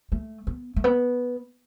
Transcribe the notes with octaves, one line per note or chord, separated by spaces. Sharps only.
A3
B3
A3
B3